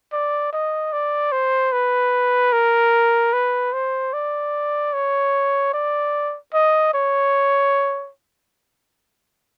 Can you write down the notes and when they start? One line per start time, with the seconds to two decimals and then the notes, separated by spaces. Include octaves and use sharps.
0.13 D5
0.53 D#5
0.93 D5
1.32 C5
1.72 B4
2.53 A#4
3.33 B4
3.73 C5
4.13 D5
4.94 C#5
5.74 D5
6.54 D#5
6.94 C#5